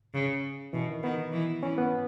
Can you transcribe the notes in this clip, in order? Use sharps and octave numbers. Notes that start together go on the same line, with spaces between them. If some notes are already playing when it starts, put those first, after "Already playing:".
C#3
B2 E3
D#3
D#3 B3
E3
E3 C#4
B3